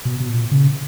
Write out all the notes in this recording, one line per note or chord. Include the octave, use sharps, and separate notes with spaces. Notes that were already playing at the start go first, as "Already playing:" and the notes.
B2
B2
A#2
C#3